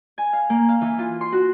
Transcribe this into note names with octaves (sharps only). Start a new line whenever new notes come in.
G#5
F5
A#3
F5
E3
F4
C6
F#4